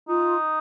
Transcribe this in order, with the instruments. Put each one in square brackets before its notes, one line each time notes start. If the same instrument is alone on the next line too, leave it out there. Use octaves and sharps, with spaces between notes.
[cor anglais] D#4 [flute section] F4